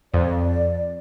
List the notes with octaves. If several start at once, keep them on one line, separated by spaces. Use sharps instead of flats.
F2 D5